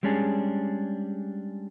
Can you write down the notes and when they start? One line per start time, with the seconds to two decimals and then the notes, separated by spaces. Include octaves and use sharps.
0.03 G3 G#3 C#4 D4 G#4